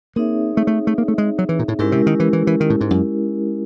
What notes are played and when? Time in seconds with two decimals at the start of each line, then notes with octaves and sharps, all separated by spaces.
0.16 A#3 C4 D#4 G#4 C#5 E5
0.57 A3
0.67 A3
0.87 A3
0.98 A#3
1.08 A3
1.18 G#3
1.38 F#3
1.49 E3
1.59 A#2
1.68 A2
1.79 G#2 G#3 C#4 E4 G4 A#4
1.92 C3
2.06 D#3
2.20 E3
2.33 E3
2.47 E3
2.60 D#3
2.70 A2
2.81 G#2
2.91 F#2